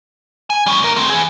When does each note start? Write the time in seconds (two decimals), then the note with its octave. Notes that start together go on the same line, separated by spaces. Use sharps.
0.50 G#5
0.66 G3 C#4
0.82 D2 A#4
0.96 A3 C4
1.10 E3 G#4